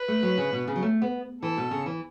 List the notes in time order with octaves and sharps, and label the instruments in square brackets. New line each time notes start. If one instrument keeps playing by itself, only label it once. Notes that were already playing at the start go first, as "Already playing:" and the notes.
Already playing: [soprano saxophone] B4
[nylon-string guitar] A3
F#3
C#3
B2
C#3
F#3
A3
B3
[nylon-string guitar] E3 [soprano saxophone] A4
[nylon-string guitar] B2
C#3
E3